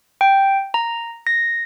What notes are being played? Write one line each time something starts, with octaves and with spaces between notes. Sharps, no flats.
G5
A#5
A#6